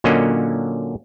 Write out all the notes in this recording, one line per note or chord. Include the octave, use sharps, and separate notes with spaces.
A#2 D3 F#3 A#3 C#4 D#5